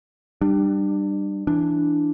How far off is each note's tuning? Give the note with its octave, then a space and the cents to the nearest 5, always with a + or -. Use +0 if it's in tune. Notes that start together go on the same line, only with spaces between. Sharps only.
G3 +0 D4 +30
E3 +10 D4 +0